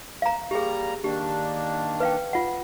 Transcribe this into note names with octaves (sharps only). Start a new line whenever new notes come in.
F5 A#5
G3 A#3 G4 G#4 A#5
D#3 A#3 D4 G4
B4 F5 G5
F4 F#5